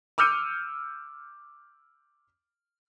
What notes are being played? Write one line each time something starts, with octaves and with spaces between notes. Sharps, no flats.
D6 E6 F6 G6 C#7 D#7